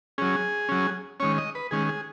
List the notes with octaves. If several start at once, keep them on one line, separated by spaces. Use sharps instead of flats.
F#3 C#4 G#4
F#3 C#4
D#3 G#3 C#4 C#5
D#5
B4
D#3 G#3 C#4 G#4
G#4